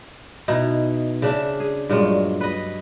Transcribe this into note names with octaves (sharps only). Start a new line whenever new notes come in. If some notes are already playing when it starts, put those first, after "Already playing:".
B2 D#4 E4
C#3 D4 E5
G#4
G2 A#2 F#3 G#3
B4 D#5